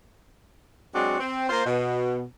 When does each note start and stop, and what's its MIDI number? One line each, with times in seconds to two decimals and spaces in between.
0.95 1.19 54
0.95 1.19 56
0.95 1.19 60
0.95 1.19 62
0.95 1.19 66
1.19 1.47 60
1.49 1.62 58
1.49 1.62 65
1.49 1.62 72
1.65 2.24 47